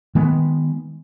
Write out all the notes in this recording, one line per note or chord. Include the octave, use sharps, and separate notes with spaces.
D#3 G#3 B3